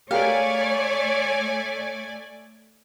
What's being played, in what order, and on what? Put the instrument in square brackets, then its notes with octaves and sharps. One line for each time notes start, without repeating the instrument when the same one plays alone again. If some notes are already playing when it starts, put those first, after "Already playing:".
[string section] A3 D5 G#5 [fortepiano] G4 G#4 A#4 [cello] C#5 [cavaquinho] F5